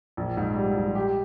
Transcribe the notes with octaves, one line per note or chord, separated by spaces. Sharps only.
A#1
G#2
G3
A#1
G4